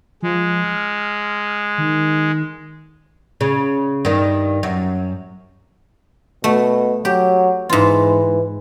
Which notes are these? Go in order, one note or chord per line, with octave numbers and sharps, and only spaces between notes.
F3 G#3
F6
D#3
C#3
G2 D#3
F#2
B2 A3
F#3 G4
G#2 E3 F4